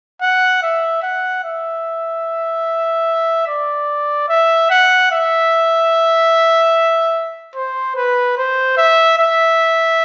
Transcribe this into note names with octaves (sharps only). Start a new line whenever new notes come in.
F#5
E5
F#5
E5
D5
E5
F#5
E5
C5
B4
C5
E5
E5